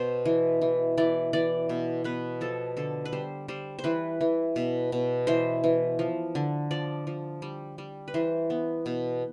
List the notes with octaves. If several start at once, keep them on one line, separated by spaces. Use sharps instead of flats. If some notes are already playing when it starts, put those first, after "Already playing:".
Already playing: B2 C5
E3
E3
E3 D5
E3 D5
B2
B2 B4
F3 A4
D3 A4
B4
G3 C5
G3 C5
C5
E3 B4
E3
B2
B2
E3 C5
E3
F3
D3
F3 D5
F3
G3
G3
B4
E3 C5
B3
B2